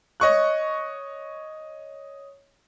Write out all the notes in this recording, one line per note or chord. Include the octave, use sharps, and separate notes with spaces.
C#5 D#5 C#6 F#6